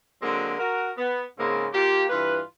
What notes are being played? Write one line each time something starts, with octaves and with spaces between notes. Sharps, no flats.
D3 F#3 G#3 A#3 C4
F#4 A#4
B3
G#2 C#3 G#3 A#3 C4
A#3 F4 G4
G2 E3 F4 B4